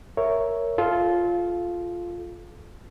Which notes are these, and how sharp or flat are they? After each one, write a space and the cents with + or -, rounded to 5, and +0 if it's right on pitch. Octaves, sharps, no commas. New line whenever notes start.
A#4 +0 C#5 +0 E5 +0
F4 +0 A4 -35